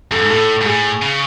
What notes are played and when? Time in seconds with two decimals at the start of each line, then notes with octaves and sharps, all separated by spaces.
0.11 F#2 A4
0.21 G#2
0.30 A2 A4
0.61 G#2
0.66 A2 G#4
1.02 C#3